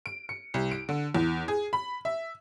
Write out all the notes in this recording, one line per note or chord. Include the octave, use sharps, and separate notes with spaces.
D7
C#7
C2
D7
D3
E2
G#4
B5
E5